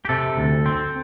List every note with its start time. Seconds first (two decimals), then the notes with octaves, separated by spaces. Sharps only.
0.05 G4
0.09 C3 A4
0.37 D2
0.66 C4